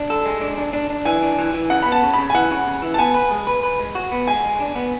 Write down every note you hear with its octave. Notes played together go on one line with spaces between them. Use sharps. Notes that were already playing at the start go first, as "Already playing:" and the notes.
Already playing: D4
A4
G#3
D4
D4
D4
D4
E3 G#5
D4
E3
E3
C#3 F#5
B3 B5
A5
C#3
C#3 B5
G#5
E3 F#5
C#3
C#3
E3
A5
B3 G#5
B4
G#3
B4
B4
G#3
F#4
B3
G#3 G#5
G#3
D4
B3